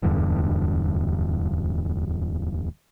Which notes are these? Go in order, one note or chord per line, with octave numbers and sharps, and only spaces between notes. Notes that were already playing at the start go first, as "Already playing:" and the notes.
D1 E2 G2 D3